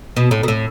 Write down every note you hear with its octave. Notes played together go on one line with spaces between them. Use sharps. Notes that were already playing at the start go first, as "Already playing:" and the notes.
B2
A2
B2
A2